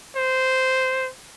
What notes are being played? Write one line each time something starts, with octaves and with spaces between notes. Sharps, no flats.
C5